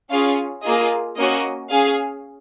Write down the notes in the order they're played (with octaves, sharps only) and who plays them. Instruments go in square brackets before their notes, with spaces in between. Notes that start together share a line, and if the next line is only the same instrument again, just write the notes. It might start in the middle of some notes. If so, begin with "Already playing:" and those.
[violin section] C#4 F4 G#4 F5
A#3 F4 G#4 D#5
A#3 C#4 F#4 D#5
C#4 G#4 F5